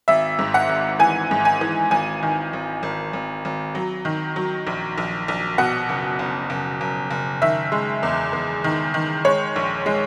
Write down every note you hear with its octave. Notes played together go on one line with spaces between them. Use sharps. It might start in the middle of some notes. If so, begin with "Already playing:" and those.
G#1 E5
G#2
F#5
G#1
E3 G#5
G#2
G#5
E3
G#1 G#5
D#3
G#1
G#1
G#1
G#1
F#3
D#3
F#3
A#1
A#1
A#1
B2 F#5
F#1
F#1
F#1
F#1
F#1
D#3 E5
G#3
E2
E2
D#3
D#3
G#3 C#5
A#1
G#3